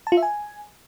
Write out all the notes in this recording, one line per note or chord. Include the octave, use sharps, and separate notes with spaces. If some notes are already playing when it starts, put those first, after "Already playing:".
A5
F4
E5
G#5